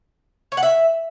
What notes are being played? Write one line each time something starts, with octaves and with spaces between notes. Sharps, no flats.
C#5
F#5
E5